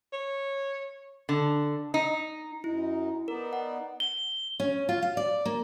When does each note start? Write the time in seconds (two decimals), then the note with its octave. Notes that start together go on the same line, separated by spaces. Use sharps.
0.13 C#5
1.29 D3
1.94 D#4
2.64 F#2 D#4 E4
3.28 B3 D#4 A#4 D5
3.53 F#5
4.00 G7
4.60 C#4
4.89 F4
5.02 F5
5.17 D5
5.45 A#3